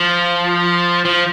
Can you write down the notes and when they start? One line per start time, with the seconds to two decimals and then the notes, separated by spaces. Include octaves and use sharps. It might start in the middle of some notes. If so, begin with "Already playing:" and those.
Already playing: F3
1.05 F3